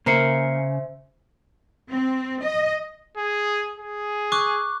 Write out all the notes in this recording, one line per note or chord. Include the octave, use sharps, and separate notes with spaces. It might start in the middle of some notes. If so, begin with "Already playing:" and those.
C#3 A#3 A#4 C5 E5 A#5 C7 C#7
C4
D#5
G#4
G#4
C#6 D6 F#6